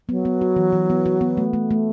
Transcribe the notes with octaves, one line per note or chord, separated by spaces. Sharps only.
F#3 B3
B3
F#4
E3
E3
B3
F#4
B3
A3
A3
A3